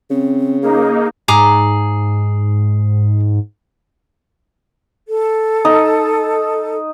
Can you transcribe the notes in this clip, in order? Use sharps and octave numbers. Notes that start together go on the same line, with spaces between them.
C#3 C4
A#3 D#4 G#4
G#2 G#4 A#5 D6
A4
D#4